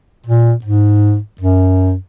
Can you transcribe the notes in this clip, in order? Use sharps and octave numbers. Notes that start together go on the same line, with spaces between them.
A#2
G#2
F#2